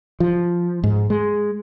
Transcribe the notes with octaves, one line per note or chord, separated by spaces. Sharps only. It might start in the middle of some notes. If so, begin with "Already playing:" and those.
F3
G#2
G#3